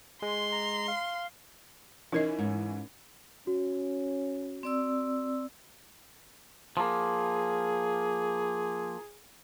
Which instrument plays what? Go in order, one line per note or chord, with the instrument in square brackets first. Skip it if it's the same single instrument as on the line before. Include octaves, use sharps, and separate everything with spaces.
[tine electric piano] G#3 [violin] C6
[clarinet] A#5
F5
[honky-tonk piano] E3 C#4 [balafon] D#4 A#4 D#5
[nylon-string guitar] G#2
[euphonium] C#4 [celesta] F#4
[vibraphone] C4 D5 E6
[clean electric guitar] F3 A#3 [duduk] G#4